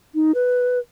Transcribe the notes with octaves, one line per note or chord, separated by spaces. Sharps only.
D#4
B4